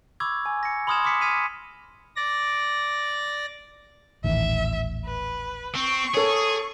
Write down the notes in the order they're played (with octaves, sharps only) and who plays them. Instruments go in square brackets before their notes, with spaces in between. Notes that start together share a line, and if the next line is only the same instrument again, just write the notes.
[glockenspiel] B5 C#6 D6 E6 G#6
G#5
A#6 C#7
B5 C6 D#6 F6 G#6 E7
C6 D6 F6 B6 C#7
D#6 F6 G#6 B6 D#7 F7
[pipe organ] D5 A#6
[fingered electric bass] D#1 A1 D#3 [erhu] E5
[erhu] B4
[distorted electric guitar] C4 [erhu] C#6
[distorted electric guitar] G#4 [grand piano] A4 C#5